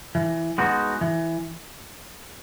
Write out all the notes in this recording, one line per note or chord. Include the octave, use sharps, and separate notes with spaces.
E3
G#3 B3 D#4 F#4
E3